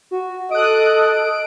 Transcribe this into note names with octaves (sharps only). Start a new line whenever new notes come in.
F#4
A4 D#5 D#6 F#6 D7